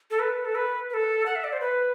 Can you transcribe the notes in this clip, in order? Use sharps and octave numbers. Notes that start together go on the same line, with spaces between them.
A4
B4
A4
B4
B4
A4
F#5
E5
D5
C5
B4